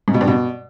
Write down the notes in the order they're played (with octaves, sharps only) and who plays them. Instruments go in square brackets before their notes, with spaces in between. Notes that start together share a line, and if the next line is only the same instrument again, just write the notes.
[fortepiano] G#2
B2
G2
B2